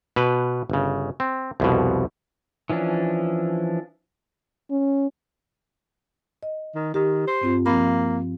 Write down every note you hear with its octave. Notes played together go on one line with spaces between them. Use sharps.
B2 B4
G1 C#3
C4
C2 F2 B2
E3 F3 C#4 D4
C#4
D#5
D#3
D#3 G4
C5
G2 C4 F4
F3 A#3 C4 B5